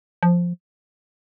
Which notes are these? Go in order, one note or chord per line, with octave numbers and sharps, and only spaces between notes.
F3